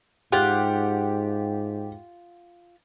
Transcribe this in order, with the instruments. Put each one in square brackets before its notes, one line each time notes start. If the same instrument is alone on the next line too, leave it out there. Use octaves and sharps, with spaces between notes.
[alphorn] G#2 [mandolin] F4 F#5 [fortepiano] G4